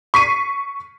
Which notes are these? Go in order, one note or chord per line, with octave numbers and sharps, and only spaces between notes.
C#6 B6 C7 D#7